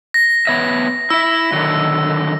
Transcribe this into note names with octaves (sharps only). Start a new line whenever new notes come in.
A#6
B3 C#5 E5
E4 E5 E6
D3 D#3 F#3